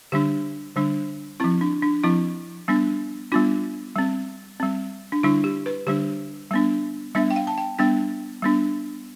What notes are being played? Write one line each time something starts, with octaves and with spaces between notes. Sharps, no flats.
D3 G3 D4 G4
D3 G3 D4
F3 C4 E4
D4
D4
F3 C4 E4
G3 B3 D4
G3 B3 D4 F4
G3 C4
G3 C4
D4
D3 G3 D4 E4
G4
B4
D3 G3 D4 G4
G3 B3 D4
G3 B3 D4 E5
G5
F5
A5
G5
G3 B3 D4 G5
G3 B3 D4